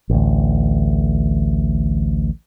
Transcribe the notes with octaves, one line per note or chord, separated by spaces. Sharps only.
A1 D2